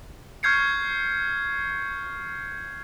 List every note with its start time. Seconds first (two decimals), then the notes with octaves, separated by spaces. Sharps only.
0.43 C#6 F6 G6 G#6 C7 C#7